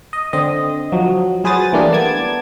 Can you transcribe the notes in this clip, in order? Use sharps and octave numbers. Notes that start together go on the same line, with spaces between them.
D#5
D3 C4 D#5
F3 F#3
F#3 G#4 B4 C5 D#6 A6
E3 G3 A3 A#3 D4
B3 A5 D6 G#6